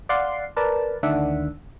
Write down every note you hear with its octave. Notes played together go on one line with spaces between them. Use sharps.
D5 F5 F#5 C6 C7
A#4 B4 D5 A5
D2 D#3 D4 E5 F#5